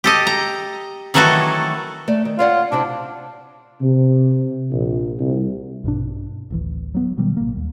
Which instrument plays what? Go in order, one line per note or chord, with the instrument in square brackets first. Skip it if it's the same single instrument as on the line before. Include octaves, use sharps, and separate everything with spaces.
[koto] G4 A4 D#5
A#5
D#3 E3 F#3 A3 F#4 A4
[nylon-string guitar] A3 D5
D#3
[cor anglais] F4 [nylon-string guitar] C#5 D5 F#5
[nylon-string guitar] C3 C4 E4 [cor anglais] D4
[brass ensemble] C3
A#1
C2
[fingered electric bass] A#1 G2 B2 D4
D1 A1 E3
F#3 B3
B2 D#3 F#3 G3
A1 A#3
D#2